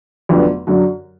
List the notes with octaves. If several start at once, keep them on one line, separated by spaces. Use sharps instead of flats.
F1 F2 D3 F#3 B3
F#2 D3 F#3